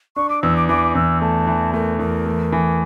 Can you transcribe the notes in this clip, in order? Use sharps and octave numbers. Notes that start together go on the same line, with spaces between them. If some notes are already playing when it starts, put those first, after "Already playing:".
D4 C#6
D6
E2 E6
D6
E3 D6
E2 E6
A3 A5
E3
A3 A#4
E2 A#4
A3
E3